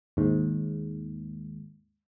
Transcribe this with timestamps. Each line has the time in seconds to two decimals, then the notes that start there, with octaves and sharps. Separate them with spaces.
0.17 D#2 G#2